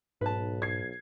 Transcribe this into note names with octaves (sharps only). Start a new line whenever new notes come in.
B1 G#2 B4 A5
G#6 C7